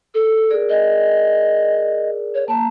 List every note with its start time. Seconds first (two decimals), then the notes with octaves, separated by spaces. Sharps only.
0.14 A4
0.50 G#4 A#4 D5
0.69 D#5
2.34 C#5
2.48 A#3 A5 A#5